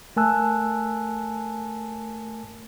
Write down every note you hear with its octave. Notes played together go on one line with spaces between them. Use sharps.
A3 A#4 G#5 A5 E6 F#6